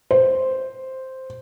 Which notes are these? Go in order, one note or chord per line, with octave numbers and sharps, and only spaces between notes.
C5